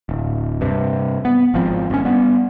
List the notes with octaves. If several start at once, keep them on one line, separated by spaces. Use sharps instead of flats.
D1
G2 C3
B3
G#1 F3 C4
G1 C#4
G3 B3